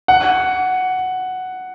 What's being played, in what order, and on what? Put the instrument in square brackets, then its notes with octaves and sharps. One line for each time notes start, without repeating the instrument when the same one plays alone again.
[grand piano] F#5